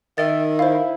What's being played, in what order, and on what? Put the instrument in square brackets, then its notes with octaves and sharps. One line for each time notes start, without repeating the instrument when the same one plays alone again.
[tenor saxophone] D#3 [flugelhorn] E5 [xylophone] A6
[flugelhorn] E4 [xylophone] C5 F5